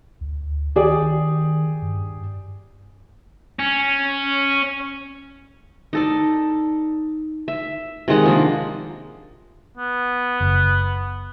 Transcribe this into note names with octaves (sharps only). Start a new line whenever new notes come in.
D2
D#3 G4 G#4 D5
G2
C#4
D#4 A4 D5
E5
C3 D#3 G#3 F#5
F3 A#3 D4
B3
F#1